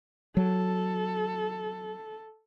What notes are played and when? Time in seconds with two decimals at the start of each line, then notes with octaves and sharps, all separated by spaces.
0.37 F#3 A4